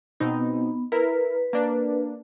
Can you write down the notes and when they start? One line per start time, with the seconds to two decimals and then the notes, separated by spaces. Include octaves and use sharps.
0.20 B2 B3 C4 D#4
0.92 E4 A#4 B4
1.53 A#3 D4